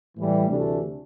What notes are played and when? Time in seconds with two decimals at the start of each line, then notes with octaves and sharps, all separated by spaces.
0.17 A2 E3 G3
0.49 D2 C3 E3 A3 D4